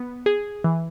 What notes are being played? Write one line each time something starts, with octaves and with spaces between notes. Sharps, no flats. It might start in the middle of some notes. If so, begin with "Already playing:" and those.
Already playing: B3
G#4
E3